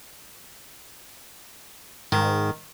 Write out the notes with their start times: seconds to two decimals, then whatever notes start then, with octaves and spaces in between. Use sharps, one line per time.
2.12 G#2 D#3